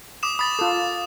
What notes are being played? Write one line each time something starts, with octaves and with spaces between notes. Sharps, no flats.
D6 D#6 E7
B5 D#6 A6
F4 A4 D#6